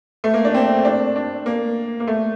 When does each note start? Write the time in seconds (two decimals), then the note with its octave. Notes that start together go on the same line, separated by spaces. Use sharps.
0.24 A3
0.34 A#3
0.45 D4
0.54 C4
0.85 D4
1.16 D4
1.46 A#3
2.00 A#3
2.07 A3